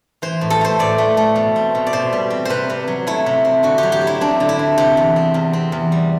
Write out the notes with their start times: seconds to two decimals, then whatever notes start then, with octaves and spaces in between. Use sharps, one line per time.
0.22 E3 C5
0.41 A2
0.50 A4
0.61 A3 C5
0.79 A2 D5
0.98 A3
1.17 A3
1.36 B2
1.56 C4
1.75 B2
1.87 D5
1.93 B2 C5
2.13 G3
2.30 C4
2.45 C3 B4 C5
2.70 C3
2.88 F#3
3.07 A3 E4
3.26 C3
3.45 C4
3.63 D3 F#4
3.78 G4
3.83 F#3
3.92 G4
4.01 C4
4.07 E4
4.21 C4 D4
4.40 D3
4.49 E4
4.59 C4
4.78 C3 G4
4.97 E2
5.16 C4
5.34 E2
5.53 C4
5.72 E2
5.92 G3